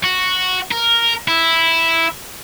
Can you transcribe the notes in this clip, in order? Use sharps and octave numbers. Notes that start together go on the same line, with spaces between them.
F#4
A#4
E4